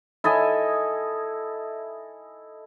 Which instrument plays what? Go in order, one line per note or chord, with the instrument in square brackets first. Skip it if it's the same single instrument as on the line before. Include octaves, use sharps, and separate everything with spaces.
[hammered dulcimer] E4 A4 D#5 G#5